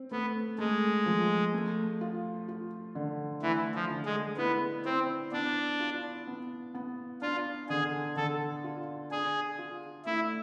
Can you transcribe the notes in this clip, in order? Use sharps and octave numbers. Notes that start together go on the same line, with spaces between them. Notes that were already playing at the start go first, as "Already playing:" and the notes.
Already playing: C4
A3 B3
G#3 A3
F3
A3
F4
F4
D3
E3 A3
F3
D3
G#3
B3 E4
C4 E4
B3 D4
F4
B3
B3
D4 F4
D3 G#4
D3 A4
F4
D4 G#4
F4
A3 E4